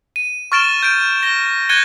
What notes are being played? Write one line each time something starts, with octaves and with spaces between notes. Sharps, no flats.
D#7
C#6 F6 A6 D7 E7 G7
G6 A6 D7
A#6 G7
F#6 G#6 A6 C#7 D#7 G7